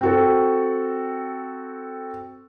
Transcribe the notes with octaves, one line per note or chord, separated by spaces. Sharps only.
C4 F#4 A4